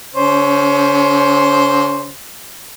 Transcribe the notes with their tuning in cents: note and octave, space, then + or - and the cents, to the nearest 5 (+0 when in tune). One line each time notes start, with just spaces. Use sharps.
D3 -45 C#4 +15 C5 +0